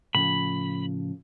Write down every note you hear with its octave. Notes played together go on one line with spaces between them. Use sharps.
A2 C#3 F3 B5